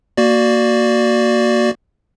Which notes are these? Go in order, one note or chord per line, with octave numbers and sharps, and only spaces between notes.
A#3 F#4 D5